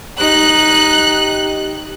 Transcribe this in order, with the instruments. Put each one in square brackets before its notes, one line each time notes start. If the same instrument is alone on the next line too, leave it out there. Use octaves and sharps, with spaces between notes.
[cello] D#4 [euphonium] G4 [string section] F#6